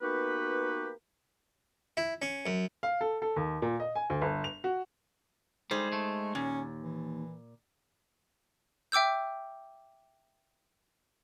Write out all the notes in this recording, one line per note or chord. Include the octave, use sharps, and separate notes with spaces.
A#3 B3 D#4 F#4 G4 B4
E4
C#4
F#2
F5
A4
A4
D#2
A#2
D#5
G#5
D2
G1
F7
F#4
G3 G#3 D#4 G#4 C5
A3
D#2 A#2 C#4
E3
E5 G5 D6 E6 G6